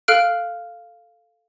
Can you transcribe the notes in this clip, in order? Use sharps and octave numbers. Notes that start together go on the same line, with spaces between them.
A4 F5 F6 F#6 D7